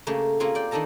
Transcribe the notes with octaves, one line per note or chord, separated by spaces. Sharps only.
C#3 A3 A#3 C#4 G4
A#3 C4 C#4 F4 G#4
D5 G5
D#3 D4 D#4 A4 A5 A#5